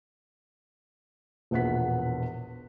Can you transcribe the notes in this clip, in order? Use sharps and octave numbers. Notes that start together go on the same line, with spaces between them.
E1 A#1 B3 F#5 F#6 B6